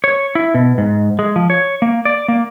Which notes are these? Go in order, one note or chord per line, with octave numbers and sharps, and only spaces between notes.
C#5
E4
B2
G#2
G#3
F3
C#5
A#3
D5
A#3